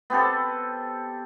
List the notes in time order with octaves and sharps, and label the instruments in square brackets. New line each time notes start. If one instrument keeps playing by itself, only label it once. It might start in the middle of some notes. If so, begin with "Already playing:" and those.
[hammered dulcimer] B3 C4 G4 A4